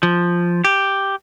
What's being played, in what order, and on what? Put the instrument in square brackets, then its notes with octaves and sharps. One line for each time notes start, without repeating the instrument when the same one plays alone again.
[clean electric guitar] F3
G4